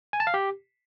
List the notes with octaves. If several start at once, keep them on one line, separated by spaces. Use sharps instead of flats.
G#5
A5
F5
G4